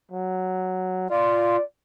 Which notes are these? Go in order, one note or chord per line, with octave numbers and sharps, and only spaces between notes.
F#3
F4 D5